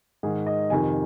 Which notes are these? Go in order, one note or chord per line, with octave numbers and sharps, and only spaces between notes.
G#2 D#3 G#4
D#5
F2 C3 D#3 G#5